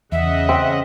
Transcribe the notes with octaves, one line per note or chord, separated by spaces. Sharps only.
E2 C#3 D#5 E5 F#5
C4